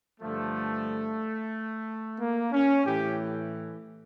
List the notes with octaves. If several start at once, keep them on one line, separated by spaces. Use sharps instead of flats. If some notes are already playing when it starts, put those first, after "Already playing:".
G2 D3 F3 A3
A#3
C#4
A2 E3 G4